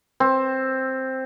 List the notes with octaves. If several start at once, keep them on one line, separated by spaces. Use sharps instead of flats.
C4